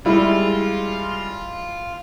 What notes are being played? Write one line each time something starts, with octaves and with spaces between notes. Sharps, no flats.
G3 G#3 E4 F4